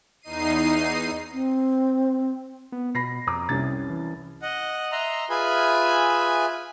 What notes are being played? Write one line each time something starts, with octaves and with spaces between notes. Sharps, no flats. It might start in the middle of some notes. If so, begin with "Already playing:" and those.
E2 D#4 C7 D#7
C4
B3
B2 B5 A#6 C7
F2 A#5 D6 D#6
C2 C3 C#4 A6
E3
D#5 F#5
D#5 E5 A#5 C6
F4 G#4 B4 E5 G#5 B5